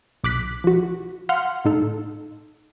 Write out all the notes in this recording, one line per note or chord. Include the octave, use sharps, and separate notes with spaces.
B1 D6 F#6 B6
F3 F#4
F5 F#5 C6 F6
A2 D#4 A4